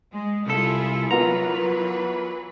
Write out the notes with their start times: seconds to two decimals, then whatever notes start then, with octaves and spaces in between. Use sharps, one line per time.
0.13 G#3
0.47 C2 E4 F4 G#4 A4
1.11 E3 F#3 B3 F4 A#4 B4 A#5